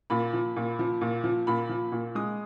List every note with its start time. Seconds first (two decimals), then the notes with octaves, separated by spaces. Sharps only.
0.10 A#2 B5
0.33 F3
0.56 A#2
0.79 F3
1.01 A#2
1.24 F3
1.47 A#2 B5
1.69 F3
1.92 A#2
2.15 G#3 D#6